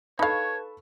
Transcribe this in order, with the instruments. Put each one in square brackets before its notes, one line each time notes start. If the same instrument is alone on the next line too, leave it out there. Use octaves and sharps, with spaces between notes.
[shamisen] D#4 F5 [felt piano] A4 B5 [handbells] B4 A5 C#6 [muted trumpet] C#5